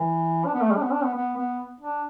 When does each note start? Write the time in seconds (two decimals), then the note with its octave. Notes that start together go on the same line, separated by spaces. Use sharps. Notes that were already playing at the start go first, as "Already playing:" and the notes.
Already playing: E3
0.45 D4
0.54 B3
0.62 A3
0.70 G3
0.76 D4
0.82 B3
0.92 D4
1.03 B3
1.14 B3
1.37 B3
1.81 D4